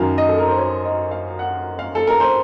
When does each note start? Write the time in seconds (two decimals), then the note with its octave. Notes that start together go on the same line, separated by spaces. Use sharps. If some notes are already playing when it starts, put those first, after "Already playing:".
Already playing: F#2 D#3 F#3 F5
0.18 D#5
0.29 A4
0.38 A#4
0.48 C5
0.58 C#5
0.85 D#5
1.11 F5
1.39 F#5
1.79 F5
1.95 A4
2.07 A#4
2.20 C5